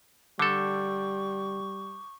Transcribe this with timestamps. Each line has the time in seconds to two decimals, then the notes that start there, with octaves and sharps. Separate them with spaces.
0.39 D3 G3 A4 C#6 D6 G6